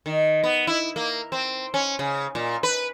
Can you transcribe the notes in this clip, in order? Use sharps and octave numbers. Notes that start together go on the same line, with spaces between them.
D#3
B3
E4
A#3
C4
C#4
C#3
A#2
B4